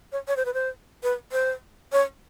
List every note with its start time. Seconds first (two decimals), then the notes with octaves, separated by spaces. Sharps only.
0.12 C#5
0.28 C#5
0.36 C5
0.45 B4
0.54 C5
1.03 B4
1.32 C5
1.92 C#5